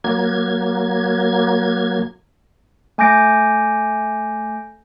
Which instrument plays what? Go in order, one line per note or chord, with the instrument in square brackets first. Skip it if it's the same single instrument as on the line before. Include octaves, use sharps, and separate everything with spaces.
[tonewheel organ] F#3 A#3 G#6
[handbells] A3 G#5 D6 G6 A#6 D7